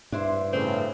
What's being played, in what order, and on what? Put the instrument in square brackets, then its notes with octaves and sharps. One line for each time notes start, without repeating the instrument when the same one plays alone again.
[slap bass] G2 [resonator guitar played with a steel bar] D4 E4 C5
[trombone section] A2 C#3 [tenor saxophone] C4